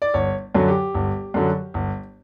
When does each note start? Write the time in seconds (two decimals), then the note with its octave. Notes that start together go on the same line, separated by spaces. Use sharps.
0.02 D5
0.14 G1 C#5
0.55 F#2 D3 F#3
0.68 G4
0.94 G1
1.34 F#2 D3 F#3
1.74 G1